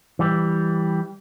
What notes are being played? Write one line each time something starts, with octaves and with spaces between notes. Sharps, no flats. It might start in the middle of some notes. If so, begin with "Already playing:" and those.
E3 G3